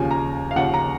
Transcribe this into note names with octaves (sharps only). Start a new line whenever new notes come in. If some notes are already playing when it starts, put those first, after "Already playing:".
Already playing: D#2 C#3 F3 G#5
A#5
F5
D#2 C#3 F3 F#5
A#5